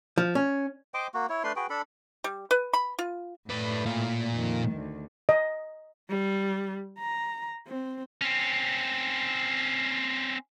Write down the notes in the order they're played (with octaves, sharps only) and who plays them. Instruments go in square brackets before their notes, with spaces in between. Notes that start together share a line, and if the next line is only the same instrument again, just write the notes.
[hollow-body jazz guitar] F3
C#4
[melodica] C5 D#5 G5 D6
A#3 F#4
E4 C#5
A3 D4 B4 C6
F#4 G#4 B4 G5
D4 A4 B5
[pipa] G3
B4
B5
F4
[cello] A2 [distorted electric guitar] B4 D5
[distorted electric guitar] A#2 F5
[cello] F2 D#3
D2
[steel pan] D#5
[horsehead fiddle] G3
A#5
C4
[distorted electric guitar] C4 C#4